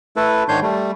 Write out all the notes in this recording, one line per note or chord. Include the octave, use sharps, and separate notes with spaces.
A3 E4 A4 B4
G#2 D#3 D4 C#5 C6 G6
G3 A3